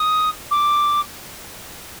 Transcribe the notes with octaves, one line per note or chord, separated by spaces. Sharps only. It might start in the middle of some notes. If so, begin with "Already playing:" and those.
Already playing: D#6
D6